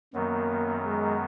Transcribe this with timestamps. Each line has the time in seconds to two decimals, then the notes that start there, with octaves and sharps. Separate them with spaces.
0.13 F#2 D#3 F#3 A#3 B3
0.84 G#3